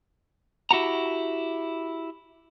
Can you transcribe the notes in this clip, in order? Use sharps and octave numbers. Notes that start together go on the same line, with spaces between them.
E4 F#4 G4 F#5 A#5